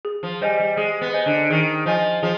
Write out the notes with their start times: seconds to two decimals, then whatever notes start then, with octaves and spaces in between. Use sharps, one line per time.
0.05 G#4
0.23 F3
0.41 G3 C5 D#5 G#5
0.59 G3
0.77 G#3 G#4
1.01 B3
1.13 C5 D#5 G#5
1.26 D3
1.50 D#3 G#4
1.86 F3 C5 D#5 G#5
2.23 F3 G#4